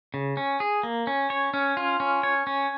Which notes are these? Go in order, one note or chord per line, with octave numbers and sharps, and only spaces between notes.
C#3
C#4
G#4
A#3
C#4
C#5
C#4
F4
C#4
C#5
C#4